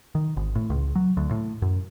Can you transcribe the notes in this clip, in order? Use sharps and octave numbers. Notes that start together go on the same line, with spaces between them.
D#3
G#1
A2
C#2
F#3
D2
A2
F#2